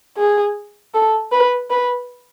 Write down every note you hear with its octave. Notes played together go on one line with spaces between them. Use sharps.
G#4
A4
B4
B4